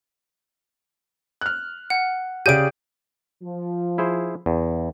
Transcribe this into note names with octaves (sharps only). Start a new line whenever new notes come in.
F6 F#6
F#5
C#3 G4 G#4 D5 G6 D7 D#7
F3
E4 G#4 C5
E2